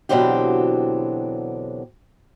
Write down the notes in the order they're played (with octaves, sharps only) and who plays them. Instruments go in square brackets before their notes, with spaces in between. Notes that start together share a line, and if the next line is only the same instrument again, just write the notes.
[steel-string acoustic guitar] B2 D3 E3 F#3 C4 G4